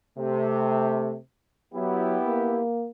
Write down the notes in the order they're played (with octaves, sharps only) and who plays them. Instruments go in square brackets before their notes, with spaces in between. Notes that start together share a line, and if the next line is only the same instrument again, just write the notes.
[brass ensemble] C3 [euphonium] A3
[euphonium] F#3 [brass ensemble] B3 E4 G4
[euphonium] A#3